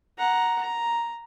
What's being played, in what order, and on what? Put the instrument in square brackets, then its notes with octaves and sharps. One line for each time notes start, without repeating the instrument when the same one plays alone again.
[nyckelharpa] F#5 A#5
A#5